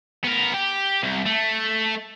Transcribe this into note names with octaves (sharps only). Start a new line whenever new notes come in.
B3 A#4
G4
C2
A3